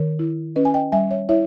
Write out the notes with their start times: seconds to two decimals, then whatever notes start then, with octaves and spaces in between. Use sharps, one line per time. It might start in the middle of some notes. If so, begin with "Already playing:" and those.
Already playing: D#3 A#4 C#5
0.19 E4
0.56 C#4 B4 D#5
0.65 G#5
0.74 D#5 G5
0.92 G3 E5 G#5
1.10 C#5 E5
1.29 E4 C#5 E5